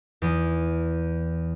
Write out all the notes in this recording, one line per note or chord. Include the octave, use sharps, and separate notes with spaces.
E2